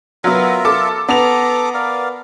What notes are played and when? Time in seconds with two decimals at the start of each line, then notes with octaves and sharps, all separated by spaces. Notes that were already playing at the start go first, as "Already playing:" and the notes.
0.24 F#3 B3 F4 A#4 E5
0.65 A4 D6
1.09 B3 A4 A#5 D6 F7
1.74 A#4 D5 F5